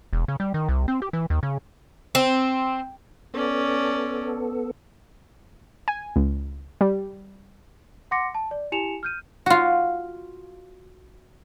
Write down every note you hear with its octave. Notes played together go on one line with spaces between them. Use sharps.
E1
C#3
G3
D#3
C2
C4
G4
E3
D#2
C#3
C4
B3 C#4 A4 D5
G#5
C#2
G3
F#5 C6 D6 A#6 C#7
A5
D5
E4 G4 G#5 C#7 E7 F7
F6 G6 D#7
F4 F#4